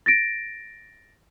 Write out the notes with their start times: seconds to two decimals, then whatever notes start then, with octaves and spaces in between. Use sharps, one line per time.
0.06 A6 A#6 D7